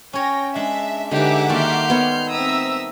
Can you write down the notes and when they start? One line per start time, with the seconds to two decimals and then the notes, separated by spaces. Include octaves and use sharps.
0.13 C#4 C#5 G5 A#6
0.55 G#3 D4 E5
1.11 D3 G#3 D#4 G4 B4 E5 F#5 D6
1.50 D#3 G3 A#3 F#4 A4 C6 F6 G6
1.90 D#3 B3 C#5
2.28 C4 E5 A#5 D#6 E6